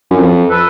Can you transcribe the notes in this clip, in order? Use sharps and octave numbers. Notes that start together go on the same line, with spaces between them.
F#2
F2
A4 B4